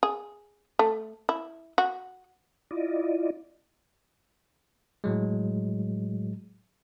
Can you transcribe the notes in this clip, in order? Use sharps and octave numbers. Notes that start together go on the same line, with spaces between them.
G#4
A3
E4
F#4
E4 F4 D5 D#5
A2 F#3 G#3